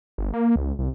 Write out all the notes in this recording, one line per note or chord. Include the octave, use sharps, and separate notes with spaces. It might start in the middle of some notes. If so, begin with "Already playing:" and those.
G1
A#3
C#2
C2